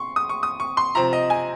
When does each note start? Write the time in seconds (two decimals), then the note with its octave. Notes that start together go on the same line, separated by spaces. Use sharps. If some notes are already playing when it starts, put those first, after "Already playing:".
Already playing: C6 C#6
0.16 D#6
0.29 C#6
0.43 D#6
0.60 C#6
0.77 C6
0.95 C3 F3 C4 A#5
1.13 D#5
1.30 G#5